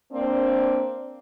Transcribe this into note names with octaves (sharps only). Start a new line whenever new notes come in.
A#3 C4 D4